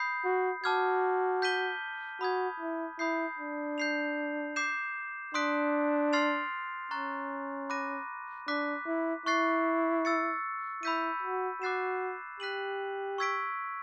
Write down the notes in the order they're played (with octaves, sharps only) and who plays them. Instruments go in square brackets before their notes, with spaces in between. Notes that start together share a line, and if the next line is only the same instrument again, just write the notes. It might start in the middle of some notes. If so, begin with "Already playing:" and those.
Already playing: [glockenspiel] B5 D#6 G6 C7
[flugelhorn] F#4
[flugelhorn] F#4 [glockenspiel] A5 D6 F6 G#6
[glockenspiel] G6 B6 D#7 G7
[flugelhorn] F#4 [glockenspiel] B5 D#6 G#6
[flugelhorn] E4
[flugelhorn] E4 [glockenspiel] B5 D#6 G6 C7
[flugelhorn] D4
[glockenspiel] G6 C7 F7
D6 G6 C7 E7
[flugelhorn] D4 [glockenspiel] C6 D#6 F#6 B6 D7
[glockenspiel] C6 F6 A6 C7 F7
[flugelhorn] C#4 [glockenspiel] A#5 C#6 F#6 A6
[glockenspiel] B5 D6 F#6 A#6 D#7
[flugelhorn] D4 [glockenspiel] D6 F#6 B6
[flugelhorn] E4
[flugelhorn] E4 [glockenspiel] C#6 F#6 A6 C7
[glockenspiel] E6 A6 C#7
[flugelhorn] E4 [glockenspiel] B5 E6 G6 B6 D#7
[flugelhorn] F#4
[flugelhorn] F#4 [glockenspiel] D6 F#6 A6 C7 E7
[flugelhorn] G4 [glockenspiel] F#6 B6 D#7 F#7
[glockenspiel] C#6 E6 G#6 B6 D7